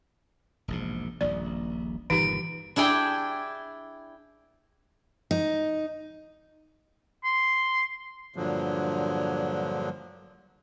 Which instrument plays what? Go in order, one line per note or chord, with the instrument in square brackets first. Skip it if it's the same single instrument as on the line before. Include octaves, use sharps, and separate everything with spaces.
[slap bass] E1 A#1 G#2
[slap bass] D#1 A#1 [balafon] D5
[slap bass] G1 A#2 D#3 [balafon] E3 D#4 G4 [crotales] D7
[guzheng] D4 E4 G#4 G5
[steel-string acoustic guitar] D#4
[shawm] C6
[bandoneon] G2 A#2 D3 F3 F#3